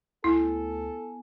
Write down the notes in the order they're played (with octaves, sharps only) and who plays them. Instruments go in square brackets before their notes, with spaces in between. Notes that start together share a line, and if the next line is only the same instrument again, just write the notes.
[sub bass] D2 [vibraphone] B3 G#5 [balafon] E4 [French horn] A4